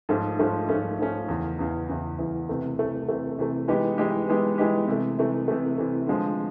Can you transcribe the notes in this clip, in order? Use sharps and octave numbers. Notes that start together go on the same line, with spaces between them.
G#2 F3 A3 C#4
G#2 F3 A3 C#4
G#2 F3 A3 C#4
G#2 F3 A3 C#4
E2 C#3 E3
E2 C#3 E3
E2 C#3 E3
E2 C#3 E3
C3 E3 A3
C3 E3 A3
C3 E3 A3
C3 E3 A3
E3 G#3 B3 D#4 G4
E3 G#3 B3 D#4 G4
E3 G#3 B3 D#4 G4
E3 G#3 B3 D#4 G4
C3 E3 A3
C3 E3 A3
C3 E3 A3
C3 E3 A3
D3 F3 G#3